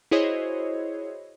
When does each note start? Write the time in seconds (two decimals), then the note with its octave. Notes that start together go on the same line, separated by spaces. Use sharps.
0.11 E4 F#4 G#4 C5 C#5 D#5